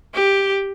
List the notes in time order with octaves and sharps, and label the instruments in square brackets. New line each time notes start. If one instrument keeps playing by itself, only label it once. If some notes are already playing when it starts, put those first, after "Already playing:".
[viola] G4